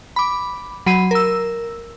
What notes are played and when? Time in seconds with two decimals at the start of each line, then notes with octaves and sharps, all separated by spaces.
0.16 B5 D6
0.86 F#3 B5 C7 D#7
1.11 A#4 E6